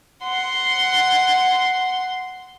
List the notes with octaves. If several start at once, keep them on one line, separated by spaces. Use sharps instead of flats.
F#5 C6